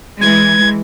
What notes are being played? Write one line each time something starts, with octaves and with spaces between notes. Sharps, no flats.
E3 G#3 G#6